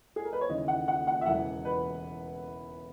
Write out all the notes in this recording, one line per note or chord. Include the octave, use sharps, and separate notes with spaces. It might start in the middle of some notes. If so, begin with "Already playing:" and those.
G#4
A#4
B4
C#5
D#2 C#3 E3 D#5
F#5
F#5
F#5
E5
E1 E2 C#3 E3 F#5
B4